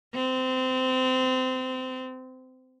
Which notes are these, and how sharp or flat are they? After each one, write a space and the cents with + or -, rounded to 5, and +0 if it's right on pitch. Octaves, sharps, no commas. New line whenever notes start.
C4 -25